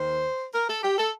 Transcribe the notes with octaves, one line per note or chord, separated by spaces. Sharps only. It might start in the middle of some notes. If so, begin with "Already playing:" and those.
Already playing: D#2 D#3 C5
A#4
A4
G4
A4